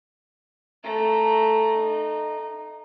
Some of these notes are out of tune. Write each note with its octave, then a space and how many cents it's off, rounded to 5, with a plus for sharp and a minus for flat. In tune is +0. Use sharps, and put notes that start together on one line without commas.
A3 +0 A#5 +0
D#4 -25 A#5 +0